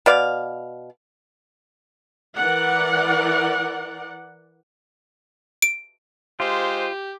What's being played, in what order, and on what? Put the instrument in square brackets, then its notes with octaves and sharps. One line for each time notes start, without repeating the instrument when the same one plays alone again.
[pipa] B2 D5 F5
[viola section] E3 A#4 D5 F#5
[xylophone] D7
[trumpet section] G#3 C5 [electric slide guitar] F4 [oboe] G4